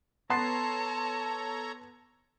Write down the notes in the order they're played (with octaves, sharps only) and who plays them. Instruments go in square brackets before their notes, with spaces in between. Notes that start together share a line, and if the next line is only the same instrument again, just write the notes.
[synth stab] B3 [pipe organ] A4 C#5 A#5 [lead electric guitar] A5 [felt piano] C6 A6 C7